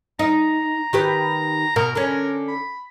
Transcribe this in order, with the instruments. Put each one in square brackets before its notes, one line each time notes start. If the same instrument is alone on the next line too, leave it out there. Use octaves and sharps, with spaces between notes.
[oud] D#4 [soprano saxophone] A#5
[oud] D#3 G4 B4
[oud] B2 [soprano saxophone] A#4
[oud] D3 C#4 [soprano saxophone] A#4
[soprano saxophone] B5